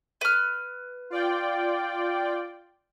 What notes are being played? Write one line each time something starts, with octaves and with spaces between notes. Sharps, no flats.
B4 F6
F4 D5 G5